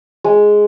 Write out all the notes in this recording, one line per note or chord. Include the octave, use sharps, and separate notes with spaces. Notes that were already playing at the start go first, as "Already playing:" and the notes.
G#3